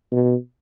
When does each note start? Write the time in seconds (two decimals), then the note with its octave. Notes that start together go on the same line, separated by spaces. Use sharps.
0.12 B2